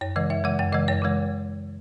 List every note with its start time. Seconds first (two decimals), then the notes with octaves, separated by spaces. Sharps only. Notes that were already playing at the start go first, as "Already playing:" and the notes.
0.01 F#2 C#5
0.16 C#3 E3 G#3 D#5
0.30 F#2 E5
0.44 C#3 E3 G#3 F#5
0.59 F#2 F#5
0.73 C#3 E3 G#3 D#5
0.88 F#2 C#5
1.02 C#3 E3 G#3